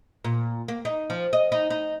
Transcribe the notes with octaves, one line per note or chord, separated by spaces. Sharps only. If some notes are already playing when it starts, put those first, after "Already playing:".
A#2
A#3
D#4
F3
D#5
D#4
D#4